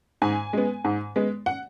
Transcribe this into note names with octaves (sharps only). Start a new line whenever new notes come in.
G#2 G#5
G#3 B3
G#2
G#3 B3
F#5